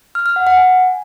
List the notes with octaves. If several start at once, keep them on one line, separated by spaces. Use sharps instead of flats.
F6
F6
F#5
F#5
G#5